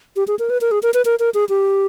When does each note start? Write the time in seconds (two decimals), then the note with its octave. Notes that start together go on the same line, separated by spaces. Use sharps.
0.16 G4
0.28 G#4
0.39 A#4
0.50 B4
0.61 A#4
0.71 G#4
0.83 A#4
0.94 B4
1.05 A#4
1.19 A#4
1.34 G#4
1.49 G4